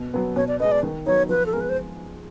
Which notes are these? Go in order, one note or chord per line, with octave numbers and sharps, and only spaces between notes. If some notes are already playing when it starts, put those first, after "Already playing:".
Already playing: B2
F#3 B3
B2 C#5
D5
G#3 B3 D#5
D5
D#3
F#3 B3 D#4 C#5
F3 B4
A4
G#3 B3 A#4 B4
C5